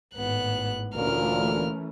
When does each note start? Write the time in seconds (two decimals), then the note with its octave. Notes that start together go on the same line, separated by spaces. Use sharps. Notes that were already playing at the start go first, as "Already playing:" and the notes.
0.15 G#1 A2 B3 F#6
0.95 D2 A#2 E3 A3 C#4 A#4 F6